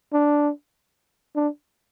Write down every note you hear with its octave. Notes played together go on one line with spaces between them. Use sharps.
D4
D4